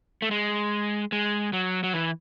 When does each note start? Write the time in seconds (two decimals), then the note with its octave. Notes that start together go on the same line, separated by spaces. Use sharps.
0.22 A3
0.31 G#3
1.12 G#3
1.53 F#3
1.83 F#3
1.93 E3